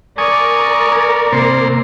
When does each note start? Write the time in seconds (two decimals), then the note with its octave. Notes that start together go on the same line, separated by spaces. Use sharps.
0.18 A#4 D5 G#5 C#6 D#6
1.32 C3 A#3 C5